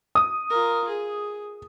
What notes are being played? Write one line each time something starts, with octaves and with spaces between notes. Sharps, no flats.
D#6
F4 A#4
G#4